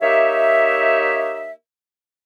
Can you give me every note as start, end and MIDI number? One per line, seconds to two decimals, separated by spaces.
0.01 1.52 58
0.01 1.52 63
0.01 1.52 67
0.01 1.52 73
0.01 1.52 76